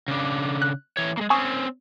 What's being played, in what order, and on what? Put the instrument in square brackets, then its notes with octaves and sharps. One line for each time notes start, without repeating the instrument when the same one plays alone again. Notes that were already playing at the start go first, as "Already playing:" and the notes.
[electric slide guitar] C#3 D4
[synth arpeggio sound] F#6
[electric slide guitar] E3 C#5
G#3 A#3
[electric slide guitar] C4 C#4 [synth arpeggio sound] G#5 C#6 D#6